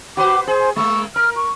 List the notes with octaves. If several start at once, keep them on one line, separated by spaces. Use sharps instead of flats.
F#4 B4 C5 D6
G#4 C5
G#3 A#3 C#6
A#4 F6
C#6